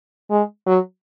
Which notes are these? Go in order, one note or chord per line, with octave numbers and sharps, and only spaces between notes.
G#3
F#3